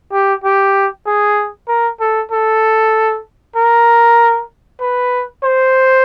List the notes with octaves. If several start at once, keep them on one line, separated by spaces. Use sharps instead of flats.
G4
G4
G#4
A#4
A4
A4
A#4
B4
C5